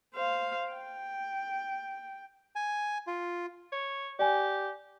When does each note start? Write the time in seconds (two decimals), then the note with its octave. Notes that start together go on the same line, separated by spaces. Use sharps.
0.14 C5 F5
0.73 G5
2.56 G#5
3.07 F4
3.72 C#5
4.19 G4 D5 G#5